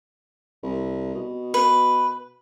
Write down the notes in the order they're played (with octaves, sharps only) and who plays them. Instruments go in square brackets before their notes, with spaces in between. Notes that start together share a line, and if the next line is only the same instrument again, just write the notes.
[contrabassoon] C2
B2
[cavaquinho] B4